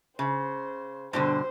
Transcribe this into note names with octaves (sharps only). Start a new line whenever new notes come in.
C#3 C5
G2 B2 D3 C5